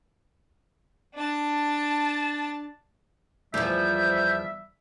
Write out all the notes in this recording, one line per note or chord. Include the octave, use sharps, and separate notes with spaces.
D4 A5
E2 F3 G3 E5 G6